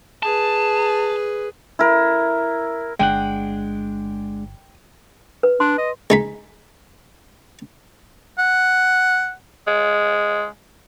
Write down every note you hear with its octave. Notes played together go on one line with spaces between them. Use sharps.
G#4 B4 A5
E4 A#4
G1 G#3 D4 F#5 G5
B4
D4 C6
D#5
G#3 D#4 B5
F#5
G#3